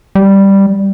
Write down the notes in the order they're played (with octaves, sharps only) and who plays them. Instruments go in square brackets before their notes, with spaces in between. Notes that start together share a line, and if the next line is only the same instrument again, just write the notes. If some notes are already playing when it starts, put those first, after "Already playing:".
[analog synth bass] G3